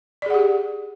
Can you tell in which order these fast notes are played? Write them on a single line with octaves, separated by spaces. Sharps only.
D5 G#4 F#5 G4